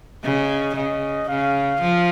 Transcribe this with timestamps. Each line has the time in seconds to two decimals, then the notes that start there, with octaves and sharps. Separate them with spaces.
0.24 C#3 D#5
0.76 C#3 D#5
1.29 C#3 F5
1.81 F3